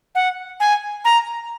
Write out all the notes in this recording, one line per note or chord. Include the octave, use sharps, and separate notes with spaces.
F#5
G#5
A#5